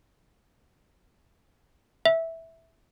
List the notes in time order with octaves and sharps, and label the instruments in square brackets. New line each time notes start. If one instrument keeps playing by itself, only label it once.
[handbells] E5